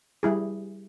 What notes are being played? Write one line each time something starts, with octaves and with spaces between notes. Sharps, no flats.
G3 E4 G#4